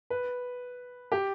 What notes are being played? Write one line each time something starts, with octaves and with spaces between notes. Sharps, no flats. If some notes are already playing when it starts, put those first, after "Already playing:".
B4
G4